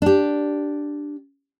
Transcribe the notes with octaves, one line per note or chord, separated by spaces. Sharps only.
D4 G4